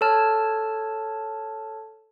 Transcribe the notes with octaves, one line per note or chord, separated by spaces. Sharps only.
A4 C#5 A5 F6